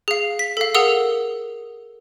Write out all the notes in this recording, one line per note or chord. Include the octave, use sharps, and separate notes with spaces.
G#4 F5
B6
A4 F5
G#4 A#4 F#5 D#6 E6